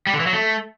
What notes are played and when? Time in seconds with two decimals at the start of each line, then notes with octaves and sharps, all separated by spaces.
0.07 G3
0.13 D3
0.20 E3
0.26 F#3
0.33 A3